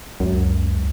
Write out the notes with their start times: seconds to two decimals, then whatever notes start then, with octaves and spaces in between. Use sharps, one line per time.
0.20 C#2 F#2